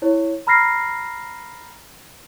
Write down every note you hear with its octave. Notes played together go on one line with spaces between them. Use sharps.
E4 C#5
A#5 B5 F6 A#6 C7